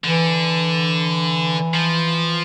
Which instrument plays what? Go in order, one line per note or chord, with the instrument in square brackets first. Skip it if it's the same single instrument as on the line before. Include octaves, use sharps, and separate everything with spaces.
[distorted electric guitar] D3 [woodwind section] E3
[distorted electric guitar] F3